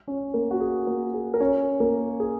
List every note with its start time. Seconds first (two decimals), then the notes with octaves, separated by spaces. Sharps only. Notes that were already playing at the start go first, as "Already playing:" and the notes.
0.07 C#4 C#5
0.34 A#3 A#4
0.51 F#4
0.60 G#4
0.87 A#3 A#4
1.14 G#4
1.34 A#4
1.40 C#4 C#5
1.80 A#3 A#4
2.20 G#4